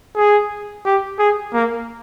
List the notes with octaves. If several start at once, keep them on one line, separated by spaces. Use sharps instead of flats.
G#4
G4
G#4
A#3